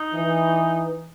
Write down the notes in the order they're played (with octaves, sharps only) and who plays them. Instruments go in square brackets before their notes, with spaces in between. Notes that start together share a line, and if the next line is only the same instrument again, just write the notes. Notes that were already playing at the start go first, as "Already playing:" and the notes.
Already playing: [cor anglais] D#4
[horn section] E3